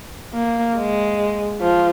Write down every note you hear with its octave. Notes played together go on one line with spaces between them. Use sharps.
A#3
G#3
F3